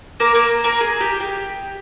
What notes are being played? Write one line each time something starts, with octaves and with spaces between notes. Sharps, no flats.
A#3 A#4
A#3 A#4
A#3 A#4
G#4
G4
G4